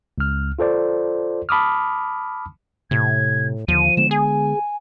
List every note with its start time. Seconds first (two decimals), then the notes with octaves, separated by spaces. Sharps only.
0.18 C#2 F6
0.59 F4 A4 C5 D5
1.49 A5 B5 D6 D#6 F6
2.91 A2 C3 G#6
3.68 D#2 D3 F3 D#7
3.97 D3 G#3 B3 E7
4.11 G#4 G#5